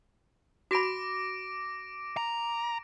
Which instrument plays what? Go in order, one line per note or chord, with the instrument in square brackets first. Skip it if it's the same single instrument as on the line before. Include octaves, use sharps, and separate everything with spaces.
[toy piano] F#4 B5 [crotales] D6 A#6 D7
[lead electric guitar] A#5